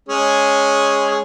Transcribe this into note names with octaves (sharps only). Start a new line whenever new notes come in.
G#3 C#4 G#4